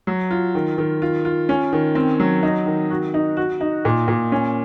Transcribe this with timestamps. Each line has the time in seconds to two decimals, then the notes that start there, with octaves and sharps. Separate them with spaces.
0.07 F#3
0.31 F4
0.55 D#3
0.78 D#3
1.02 F4
1.25 F4
1.49 C#4
1.73 D#3
1.95 C4
2.20 F#3
2.43 D#4
2.66 D#3
2.90 F#4
3.14 D#4
3.37 F#4
3.61 D#4
3.85 A#2
4.08 A#2
4.32 C#4